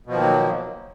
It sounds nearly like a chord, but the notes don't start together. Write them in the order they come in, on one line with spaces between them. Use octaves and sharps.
B2 F3 D#3 A#3 F#3